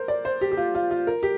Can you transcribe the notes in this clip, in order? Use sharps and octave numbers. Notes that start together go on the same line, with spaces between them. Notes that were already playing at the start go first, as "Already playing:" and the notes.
Already playing: A#4 C5
D5
C5
G4
G4
F4
F4
F4
A#4
G4